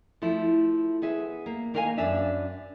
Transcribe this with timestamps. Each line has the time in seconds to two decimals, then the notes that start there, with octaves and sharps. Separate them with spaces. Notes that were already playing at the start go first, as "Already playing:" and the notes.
0.22 F3 A3 E4
1.02 B3 G#4 E5
1.46 A#3
1.74 D#3 A#3 A#4 F5 F#5 G#5
1.98 F#2 D4 E5